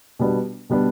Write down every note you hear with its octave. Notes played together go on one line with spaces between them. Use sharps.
B2 G3 B3 D4
B2 G3 B3 D4